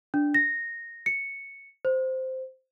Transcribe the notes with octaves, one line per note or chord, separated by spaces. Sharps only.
D4
A#6
C#7
C5